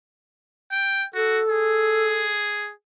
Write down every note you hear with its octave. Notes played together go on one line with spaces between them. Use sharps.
G5
F#4 A4
G#4